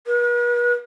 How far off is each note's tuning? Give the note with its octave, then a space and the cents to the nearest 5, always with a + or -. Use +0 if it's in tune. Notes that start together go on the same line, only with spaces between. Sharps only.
B4 -45